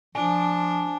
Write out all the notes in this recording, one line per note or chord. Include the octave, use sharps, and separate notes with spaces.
F3 D4 G#5